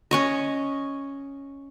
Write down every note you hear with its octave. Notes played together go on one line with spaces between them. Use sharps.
C#4 C#5 D#5